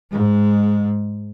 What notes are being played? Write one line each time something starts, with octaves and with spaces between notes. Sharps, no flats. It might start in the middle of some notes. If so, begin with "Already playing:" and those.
G#2 G#3